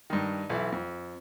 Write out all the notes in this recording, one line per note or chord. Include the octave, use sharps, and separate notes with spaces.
G2 D#3
B1 E3 E4
F2